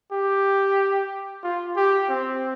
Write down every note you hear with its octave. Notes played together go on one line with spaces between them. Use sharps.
G4
F4
G4
C4